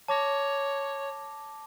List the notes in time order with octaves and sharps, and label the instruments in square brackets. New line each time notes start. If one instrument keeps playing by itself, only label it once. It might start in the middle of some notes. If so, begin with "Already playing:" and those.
[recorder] C#5 [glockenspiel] A5 D6 A#6